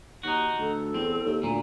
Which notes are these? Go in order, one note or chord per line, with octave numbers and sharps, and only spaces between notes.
D#2 D#4 F#4
D2 A4
E2 C4
D#2
D2 A#2